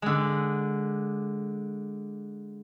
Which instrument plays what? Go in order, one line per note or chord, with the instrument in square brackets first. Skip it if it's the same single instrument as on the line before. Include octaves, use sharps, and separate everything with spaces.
[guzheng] D3 G#3